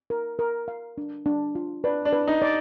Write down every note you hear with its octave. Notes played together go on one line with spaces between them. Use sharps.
A#4
A#4
F5
D4
D4
F4
D4 B4
D4
B4
D#4
D5